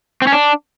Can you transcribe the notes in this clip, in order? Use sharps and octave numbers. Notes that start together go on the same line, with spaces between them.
C4
C#4
D4